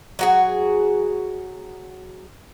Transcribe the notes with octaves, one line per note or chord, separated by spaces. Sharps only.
F#3 F#4 G#4